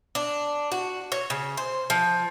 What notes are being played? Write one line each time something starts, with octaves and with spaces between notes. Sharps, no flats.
D4
F#4
C#5
C#3
C5
F3